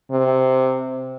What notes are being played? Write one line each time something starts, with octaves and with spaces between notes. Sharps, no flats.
C3